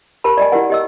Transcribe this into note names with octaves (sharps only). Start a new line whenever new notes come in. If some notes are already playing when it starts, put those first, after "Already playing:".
G4 A#4 A5 B5
D5 D#5 G#5
E4 G4 A#4 F#5
G4 D#5 E6